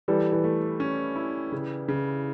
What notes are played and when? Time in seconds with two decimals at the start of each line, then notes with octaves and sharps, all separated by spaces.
0.08 E3 G3 A4
0.32 E3
0.44 A3
0.80 C#4
1.16 E4
1.52 C#3
1.88 C#3